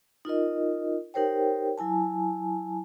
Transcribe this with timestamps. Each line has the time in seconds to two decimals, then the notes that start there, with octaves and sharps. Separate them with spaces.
0.25 D#4 F4 A#4 D#5
1.14 D#4 G4 A#4 C5 C#5 G5
1.78 F#3 E4 G#5 A5